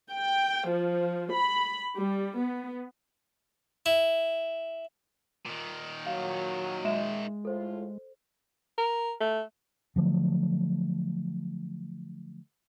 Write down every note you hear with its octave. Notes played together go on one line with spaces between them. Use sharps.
G5
F3
B5
G3
B3
E4
A#2 D#3
F#3 F5
G#3 E5 E7
A2 F4 A4 C5
A#4
A3
D3 F3 F#3 A3